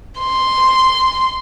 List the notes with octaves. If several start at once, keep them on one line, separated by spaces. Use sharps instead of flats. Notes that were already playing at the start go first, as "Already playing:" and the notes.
C6